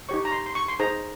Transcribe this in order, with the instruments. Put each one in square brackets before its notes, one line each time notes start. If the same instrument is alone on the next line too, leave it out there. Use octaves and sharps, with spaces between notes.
[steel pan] D#4 G4 C#5 C#6
A#5
C6
C6
C#6
C6
D#4 G#4 C5 A#5